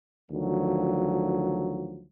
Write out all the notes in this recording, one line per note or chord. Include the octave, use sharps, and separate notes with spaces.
D2 D#3 F3 F#3